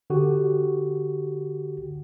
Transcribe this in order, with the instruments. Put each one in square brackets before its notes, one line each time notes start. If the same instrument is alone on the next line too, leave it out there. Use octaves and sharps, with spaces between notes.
[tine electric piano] D3 F#4 G4